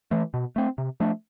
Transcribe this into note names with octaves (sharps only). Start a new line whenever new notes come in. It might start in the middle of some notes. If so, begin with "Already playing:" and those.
E3 A3
B2
A3 C4
C3
F3 A3 D4